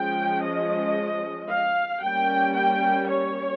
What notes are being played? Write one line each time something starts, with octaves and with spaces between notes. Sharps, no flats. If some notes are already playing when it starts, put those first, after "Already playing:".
Already playing: F3 G#3 C#4 G5
D#5
F5
G3 A#3 C#4 G5
G5
C#5